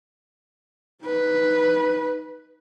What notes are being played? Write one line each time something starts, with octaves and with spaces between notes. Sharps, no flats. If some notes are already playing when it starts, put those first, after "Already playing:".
D#4 B4